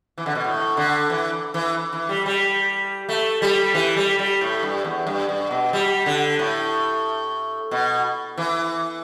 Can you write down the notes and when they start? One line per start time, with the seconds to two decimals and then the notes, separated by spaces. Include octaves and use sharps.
0.18 E3
0.26 D3
0.35 B2
0.44 A2
0.77 D3
1.10 E3
1.54 E3
1.93 E3
2.09 G3
2.26 G3
3.09 A3
3.42 G3
3.74 E3
3.97 G3
4.19 G3
4.41 A2
4.63 G2
4.84 E2
5.07 G2
5.29 G2
5.51 B2
5.73 G3
6.06 D3
6.39 A2
7.71 B2
8.38 E3